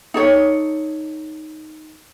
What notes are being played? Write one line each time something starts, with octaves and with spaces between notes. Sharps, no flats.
D#4 A4 C#5